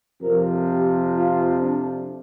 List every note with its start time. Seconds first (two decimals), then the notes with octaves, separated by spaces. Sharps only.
0.21 F2 C3 F3 A#4
0.67 G4
1.15 F4
1.61 D4